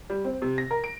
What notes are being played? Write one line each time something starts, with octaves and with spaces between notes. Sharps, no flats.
G3
C4
C3
A#6
A#4
D7